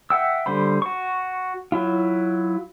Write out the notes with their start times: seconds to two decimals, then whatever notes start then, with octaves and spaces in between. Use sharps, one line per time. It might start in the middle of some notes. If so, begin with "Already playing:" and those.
0.10 E5 F#5 G5 E6
0.46 D3 G3 C5 B5
0.82 F#4 C#6
1.72 F#3 E4 F4